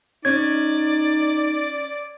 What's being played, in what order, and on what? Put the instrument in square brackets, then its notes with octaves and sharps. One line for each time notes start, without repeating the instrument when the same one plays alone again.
[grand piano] C#4 C#5 [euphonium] D#4 [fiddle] D5 [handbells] G#6